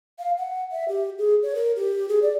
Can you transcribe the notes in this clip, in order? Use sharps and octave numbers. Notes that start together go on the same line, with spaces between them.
F5
F#5
E5
G4
G#4
C#5
A#4
G4
G#4
D5